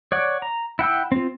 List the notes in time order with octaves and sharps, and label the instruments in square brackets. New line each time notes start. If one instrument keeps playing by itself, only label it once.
[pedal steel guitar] C#5 D5 F#5
A#5
E4 F#5 G5 E6
C4 F4